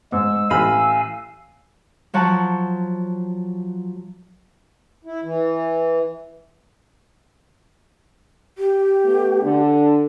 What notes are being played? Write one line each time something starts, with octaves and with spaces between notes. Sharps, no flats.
G#2 G#3 E6
A1 F5 G#5 B5 E6 F6
F3 F#3 F#4 F#5 A5
E4
E3
G4
A3 B3
D3 D4